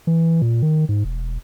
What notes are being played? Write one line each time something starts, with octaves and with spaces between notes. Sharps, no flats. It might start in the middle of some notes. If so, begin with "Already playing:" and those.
E3
A#2
D#3
G#2
E1